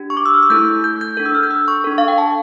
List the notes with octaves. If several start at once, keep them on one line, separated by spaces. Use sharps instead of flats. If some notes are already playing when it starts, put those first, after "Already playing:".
Already playing: D4 G4
C#6
D6
E6
F6
E6
A3 E4 A4 G6
G6
G6
D4 A4
E6
F6
G6
E6
C#6
D4 A4
F5
G5
A5